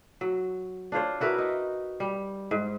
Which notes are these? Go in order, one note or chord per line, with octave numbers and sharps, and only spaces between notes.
F#3
D4 F4 C5 C#5
E4 F#4 A#4 B4
D#4
G3
G#2